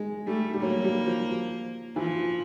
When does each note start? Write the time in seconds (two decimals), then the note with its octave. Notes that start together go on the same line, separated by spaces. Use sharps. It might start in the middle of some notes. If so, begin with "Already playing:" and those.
Already playing: G#3
0.27 G3 A3
0.53 G3
0.62 F#3 A#3
0.84 G3
1.06 F3
1.96 E3 F3